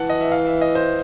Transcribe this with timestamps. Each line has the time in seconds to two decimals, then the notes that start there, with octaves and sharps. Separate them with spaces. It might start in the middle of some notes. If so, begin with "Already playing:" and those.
Already playing: E3 F#5 A5
0.10 D#5
0.21 E5
0.32 F5
0.47 E5
0.61 D#5
0.75 C5